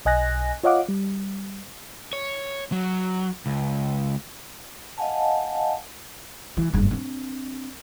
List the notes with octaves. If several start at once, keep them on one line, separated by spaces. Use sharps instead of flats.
B1 D#5 G#5 F#6 A#6
F4 C#5 D#5 F5 F#5 D6
G3
C#5
F#3
C#2
D#5 F5 F#5 G#5 A5
E3
F#1 G2
C4 D4